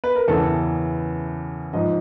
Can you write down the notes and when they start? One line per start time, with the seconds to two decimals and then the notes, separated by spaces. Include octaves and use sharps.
0.04 B4
0.16 A#4
0.28 E2 C#3 E3 A4
1.73 G#2 F3 D#5